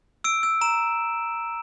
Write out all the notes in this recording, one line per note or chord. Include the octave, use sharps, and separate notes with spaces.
E6 D7
E6
A#5 E7